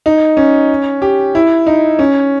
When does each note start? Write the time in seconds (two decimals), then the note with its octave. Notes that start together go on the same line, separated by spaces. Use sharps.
0.06 D#4
0.37 C#4
1.02 G4
1.35 E4
1.67 D#4
1.99 C#4